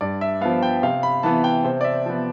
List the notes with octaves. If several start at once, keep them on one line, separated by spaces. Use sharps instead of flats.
G2 D5
E5
F3 B3 F5
G5
C3 F5
B5
E3 B3 A5
G5
C3 C5
D5
E5
F3 B3